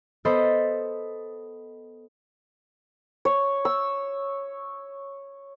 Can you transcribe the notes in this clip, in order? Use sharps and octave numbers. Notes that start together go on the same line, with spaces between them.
B3 A4 C5 D#5 B5
C#5
E6